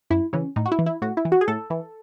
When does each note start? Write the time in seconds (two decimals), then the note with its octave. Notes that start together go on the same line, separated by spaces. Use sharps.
0.10 F#2 E4
0.33 C#3 E3 C#4
0.56 A2 D#4
0.66 F#4
0.72 E4
0.79 E3
0.86 E4
1.02 A2 F#4
1.17 E4
1.25 E3
1.32 F#4
1.41 G#4
1.48 A2 A4
1.70 E3